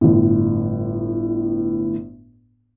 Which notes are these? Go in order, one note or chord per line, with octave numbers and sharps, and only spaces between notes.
G1 A2